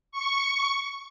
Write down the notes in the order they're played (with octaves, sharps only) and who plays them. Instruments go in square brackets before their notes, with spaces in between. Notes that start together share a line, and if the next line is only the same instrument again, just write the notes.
[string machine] C#6